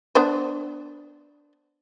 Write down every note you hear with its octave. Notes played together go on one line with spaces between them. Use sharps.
B3 D4 C5